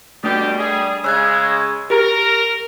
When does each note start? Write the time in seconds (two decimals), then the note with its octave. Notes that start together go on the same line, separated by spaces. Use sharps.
0.24 B2 G3 A3 D4 G4
0.58 G3 G#4
1.04 C#3 G#3 E6 F#6 G#6
1.90 G4 A#4